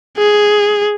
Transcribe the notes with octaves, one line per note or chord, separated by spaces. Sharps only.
G#4